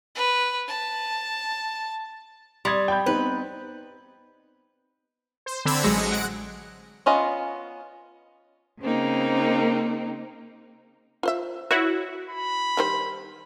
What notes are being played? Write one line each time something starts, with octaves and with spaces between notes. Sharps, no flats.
B4
A5
G3 C6 D#6 G#6
G5 B5 G6
B3 C4 D#4 B4
C5
D3 C4 D4 B5 E6 G#6
A1 F#3 G#3 A#6 C#7
F#5 D7
B3 C#4 F4 D#5
C#3 A#3 C4 D#4
F4 C5 E5
E4 F#4 C#5 E5
B5
D#3 G3 C5